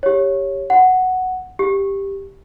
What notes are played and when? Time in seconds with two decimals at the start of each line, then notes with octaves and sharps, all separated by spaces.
0.03 G4 C#5
0.70 F#5
1.59 G4